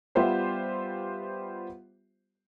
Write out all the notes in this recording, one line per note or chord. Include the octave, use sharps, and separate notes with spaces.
G3 B3 F4 G4 C5 E5